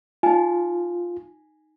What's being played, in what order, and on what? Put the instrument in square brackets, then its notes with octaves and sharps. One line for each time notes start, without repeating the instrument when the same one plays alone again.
[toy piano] D#4 G#5 [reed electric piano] F4